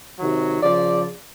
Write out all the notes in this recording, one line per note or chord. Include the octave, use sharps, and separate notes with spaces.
C3 D#3 F#3
C#3 F3 D5